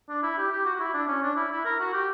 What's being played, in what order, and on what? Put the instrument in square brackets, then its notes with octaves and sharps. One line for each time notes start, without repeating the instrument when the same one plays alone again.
[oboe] D4
E4
G4
G4
F#4
F#4
E4
D4
C#4
D4
E4
E4
A#4
F#4
G4